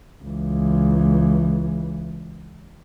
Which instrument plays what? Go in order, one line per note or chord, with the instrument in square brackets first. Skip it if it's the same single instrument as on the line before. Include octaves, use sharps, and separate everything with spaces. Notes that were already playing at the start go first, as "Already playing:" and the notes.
[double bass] C#2 E3